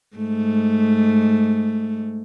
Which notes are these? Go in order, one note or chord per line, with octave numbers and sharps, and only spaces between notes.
G#2 A3